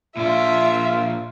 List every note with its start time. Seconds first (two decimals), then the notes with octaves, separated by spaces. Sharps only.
0.17 A#2 D4 F4 E5